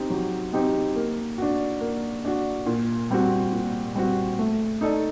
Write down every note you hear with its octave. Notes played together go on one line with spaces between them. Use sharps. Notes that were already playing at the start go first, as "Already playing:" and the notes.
Already playing: C4 D#4 G4
F#3
C4 D#4 G4
A#3
D4 F#4
A#3
D4 F#4
A#2
G3 C4 F#4
A#2
G3 C4 F#4
A3
D#4 A4 D5